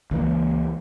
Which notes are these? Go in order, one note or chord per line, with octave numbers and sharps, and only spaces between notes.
C#2 E3 A#3